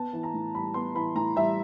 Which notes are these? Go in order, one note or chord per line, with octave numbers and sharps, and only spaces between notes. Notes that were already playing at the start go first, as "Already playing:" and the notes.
Already playing: B3 A5
E3
A#5
A2
G3 B5
B3 C6
E3 B5
A2 A#5
G3 E5